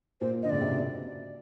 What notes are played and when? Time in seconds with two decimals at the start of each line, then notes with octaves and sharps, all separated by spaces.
0.21 A#2 C5
0.43 D3 D#5
0.50 C#3 D5
0.61 C3
0.69 B2